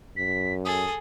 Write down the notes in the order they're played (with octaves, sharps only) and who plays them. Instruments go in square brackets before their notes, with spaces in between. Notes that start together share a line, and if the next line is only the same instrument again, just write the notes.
[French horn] F#2 [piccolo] B6
[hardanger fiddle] G#4 A4 [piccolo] D#6